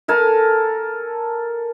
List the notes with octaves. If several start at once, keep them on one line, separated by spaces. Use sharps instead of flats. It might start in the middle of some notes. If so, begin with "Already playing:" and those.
A4 A#4 G#5 A5